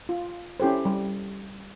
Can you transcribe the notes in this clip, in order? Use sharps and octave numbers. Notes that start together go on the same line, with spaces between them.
F4
C#4 E4 G4 A4 C5
G3